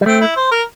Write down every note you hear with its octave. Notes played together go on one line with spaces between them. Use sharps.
G3
A3 C4
E4
C5
A#4